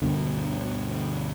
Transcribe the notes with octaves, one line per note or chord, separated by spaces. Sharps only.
D2 G2 B2 D3